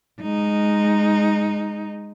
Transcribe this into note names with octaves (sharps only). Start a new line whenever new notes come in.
G#3 D#4